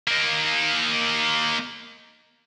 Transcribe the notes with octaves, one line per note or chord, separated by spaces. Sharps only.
A#3 D#4